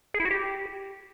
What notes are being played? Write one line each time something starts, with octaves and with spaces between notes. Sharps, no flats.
G#4
E4
F#4
G4